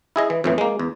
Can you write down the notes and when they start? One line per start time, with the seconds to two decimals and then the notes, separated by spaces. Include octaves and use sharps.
0.16 E4 G#4 D#5
0.30 E3
0.44 F2 A2 E3
0.58 G#3 A#3
0.79 E2